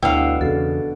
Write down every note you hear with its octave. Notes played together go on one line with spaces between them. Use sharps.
D2 B2 D3 D4 E4 C#5 F5 G5
E2 C#3 F#4 A4